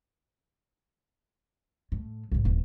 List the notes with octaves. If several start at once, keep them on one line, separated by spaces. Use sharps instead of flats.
A2
C2 G#2
D#1 E3